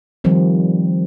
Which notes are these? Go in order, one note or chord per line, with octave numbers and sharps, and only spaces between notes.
D#3 F3 G3 C4